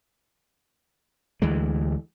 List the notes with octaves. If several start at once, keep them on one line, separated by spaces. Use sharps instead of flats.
D2 E3 G#3